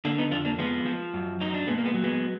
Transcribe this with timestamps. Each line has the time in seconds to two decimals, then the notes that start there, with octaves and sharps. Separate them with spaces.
0.05 D3 A#3 D4
0.18 B3 D#4
0.31 F2 D4 F4
0.45 A#3 D4
0.59 F3 G#3 B3
0.86 F3
1.14 F#2
1.40 F#3 D#4
1.54 D4
1.67 A#2 G#3 B3
1.78 A#3
1.85 G#3 B3
1.94 F#3
2.04 G#3 B3